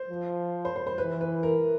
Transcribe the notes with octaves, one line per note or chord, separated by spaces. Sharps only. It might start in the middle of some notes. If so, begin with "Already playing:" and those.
Already playing: C5
F3
C5
C5
C5
E3 B4
B4
A#4